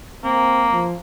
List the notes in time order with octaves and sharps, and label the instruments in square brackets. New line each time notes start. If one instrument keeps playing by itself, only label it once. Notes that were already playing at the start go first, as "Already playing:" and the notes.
[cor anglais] A#3 [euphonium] C4
[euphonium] F3